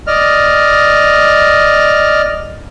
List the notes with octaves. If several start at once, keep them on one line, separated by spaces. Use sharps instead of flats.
D5 D#5 F6